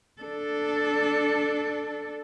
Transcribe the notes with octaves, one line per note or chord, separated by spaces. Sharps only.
D4 A4